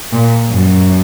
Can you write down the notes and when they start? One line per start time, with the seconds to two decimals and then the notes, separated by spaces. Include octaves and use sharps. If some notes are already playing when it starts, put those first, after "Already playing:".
0.13 A#2
0.51 F#2